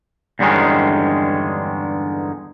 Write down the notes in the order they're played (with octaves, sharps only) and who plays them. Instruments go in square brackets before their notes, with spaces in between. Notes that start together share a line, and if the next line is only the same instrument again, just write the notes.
[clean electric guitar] E2 G2 D3 D#3 G#3 C#4